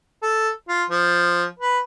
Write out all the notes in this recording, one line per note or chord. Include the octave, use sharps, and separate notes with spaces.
A4
F4
F3
B4